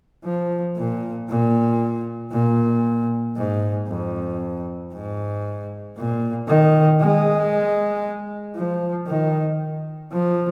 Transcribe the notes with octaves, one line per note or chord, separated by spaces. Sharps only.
F3
A#2
A#2
A#2
G#2
F2
G#2
A#2
D#3
G#3
F3
D#3
F3